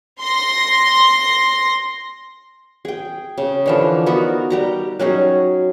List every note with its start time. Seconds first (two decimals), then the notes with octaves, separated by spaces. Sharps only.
0.21 C6 A#6
2.85 G#4 G5
3.37 C#3
3.66 D3 E3 F3
4.06 B3 D#4 F#4 A#4
4.50 G3 G4 A#5
4.99 F#3 C#4 D#4 G#4